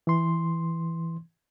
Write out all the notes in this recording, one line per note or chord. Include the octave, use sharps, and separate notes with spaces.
E3 C6